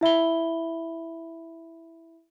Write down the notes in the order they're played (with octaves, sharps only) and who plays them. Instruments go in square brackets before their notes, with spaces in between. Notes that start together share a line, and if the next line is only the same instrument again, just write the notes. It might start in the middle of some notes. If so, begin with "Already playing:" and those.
[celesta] E4 E5 B5 G7